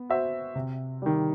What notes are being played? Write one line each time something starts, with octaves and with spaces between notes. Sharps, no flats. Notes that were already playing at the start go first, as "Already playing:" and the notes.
Already playing: B3
F#4 C5 E5
C3
D#3 G3